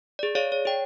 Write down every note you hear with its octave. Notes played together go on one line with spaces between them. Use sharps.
G#4 D5
G#4 C#5 D5 F5
C#5
G#4 G5